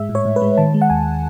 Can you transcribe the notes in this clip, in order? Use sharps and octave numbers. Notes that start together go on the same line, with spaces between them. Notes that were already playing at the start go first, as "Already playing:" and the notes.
Already playing: G#2 G#3 E5
A2
C#5
A2
B4
G#3
D#3 A5
G#3
F#5
D#2 G#5